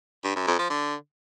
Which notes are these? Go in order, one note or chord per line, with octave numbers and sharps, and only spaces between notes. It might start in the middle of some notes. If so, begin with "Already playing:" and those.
G2
F#2
F2
F3
D3